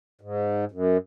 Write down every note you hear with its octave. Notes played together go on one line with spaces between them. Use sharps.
G#2
F#2